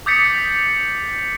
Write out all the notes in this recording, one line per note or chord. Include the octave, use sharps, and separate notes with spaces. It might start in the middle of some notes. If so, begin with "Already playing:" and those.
D6 D#6 G6 A6 B6 C#7